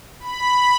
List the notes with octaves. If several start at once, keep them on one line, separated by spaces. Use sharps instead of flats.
B5